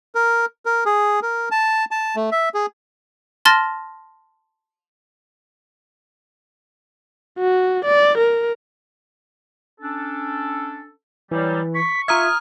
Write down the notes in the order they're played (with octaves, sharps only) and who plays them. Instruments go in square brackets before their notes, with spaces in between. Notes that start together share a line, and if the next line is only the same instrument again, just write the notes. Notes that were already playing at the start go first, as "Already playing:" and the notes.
[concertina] A#4
A#4
G#4
A#4
A5
A5
A3
E5
G#4
[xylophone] A5 C6 F6 A6 A#6
[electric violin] F#4
D5
A#4
[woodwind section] C#4 D4 A4
[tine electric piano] E3 [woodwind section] F#3 G3
[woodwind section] C#6 [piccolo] B6
[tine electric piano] F4 E5 [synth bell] A#5 D#6 G#6 [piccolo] F6